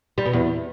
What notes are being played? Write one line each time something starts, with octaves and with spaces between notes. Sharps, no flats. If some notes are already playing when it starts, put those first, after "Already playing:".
G3
B2
E2